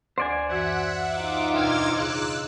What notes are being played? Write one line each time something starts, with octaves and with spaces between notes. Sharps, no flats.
D2 C5 D5 G#5
F#2 E3 F#4 E5 F#5
D#4 F4 D6
D#2 B2 D4 E6 F6 G#6
C#3 G#4 E6 F#6